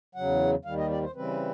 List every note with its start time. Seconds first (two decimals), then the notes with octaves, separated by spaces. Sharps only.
0.15 E2 C#3 F#3 F#5
0.65 D#2 D#3 G3 F5
0.78 D#5
0.90 D5
1.03 C5
1.15 C#3 E3 G3 C4 B4